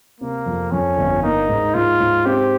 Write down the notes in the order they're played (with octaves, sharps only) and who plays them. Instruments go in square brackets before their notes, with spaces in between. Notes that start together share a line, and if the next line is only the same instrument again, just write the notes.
[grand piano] C3 [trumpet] A#3
[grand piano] F2
[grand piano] F2 [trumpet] C#4
[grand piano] G1
[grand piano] A#3 [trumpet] D#4
[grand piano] G#2
[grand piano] G#2 [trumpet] F4
[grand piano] G#2
[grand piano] C4 [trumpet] G4